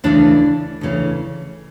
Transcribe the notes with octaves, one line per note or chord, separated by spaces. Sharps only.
D2 C#3 E3 D4
D2 C#3 E3